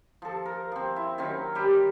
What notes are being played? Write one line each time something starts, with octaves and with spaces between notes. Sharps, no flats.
F3 A4
A#4
F3 C4
E4
D#3 F#3 C4 C#4
G3 G4